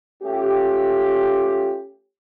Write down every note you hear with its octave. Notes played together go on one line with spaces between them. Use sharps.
A3 C#4 F4 G4